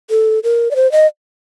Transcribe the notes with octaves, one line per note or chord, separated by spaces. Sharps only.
A4
A#4
D5
C5
D#5